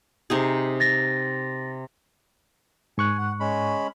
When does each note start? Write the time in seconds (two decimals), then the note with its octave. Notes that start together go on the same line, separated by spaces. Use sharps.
0.30 C3 D#4 G#4
0.80 A6 A#6
2.98 G#2 G#5 C#6 F#6
3.18 F#5
3.40 G#3 C#4 B5